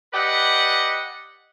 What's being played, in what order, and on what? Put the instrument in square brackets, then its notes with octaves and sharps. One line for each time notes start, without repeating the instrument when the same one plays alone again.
[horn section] G4 B4 D5 D#5 F#5